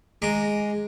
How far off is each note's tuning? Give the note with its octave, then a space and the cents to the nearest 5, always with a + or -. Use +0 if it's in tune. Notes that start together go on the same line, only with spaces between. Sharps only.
G#3 +0 A#5 -5 D6 +0